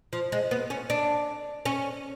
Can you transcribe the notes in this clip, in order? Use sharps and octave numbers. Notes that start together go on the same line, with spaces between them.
F3
G#3
B3
C#4
D4
C#4